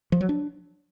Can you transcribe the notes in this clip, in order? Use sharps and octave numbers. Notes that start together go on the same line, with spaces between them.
F3
F#3
D4